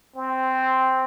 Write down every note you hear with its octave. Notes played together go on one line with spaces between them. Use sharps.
C4